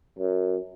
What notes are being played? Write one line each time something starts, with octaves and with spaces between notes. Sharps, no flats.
F#2